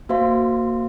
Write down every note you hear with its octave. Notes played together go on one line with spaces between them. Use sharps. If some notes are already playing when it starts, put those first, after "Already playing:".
A#3 F#4 C5 E5 F5 C6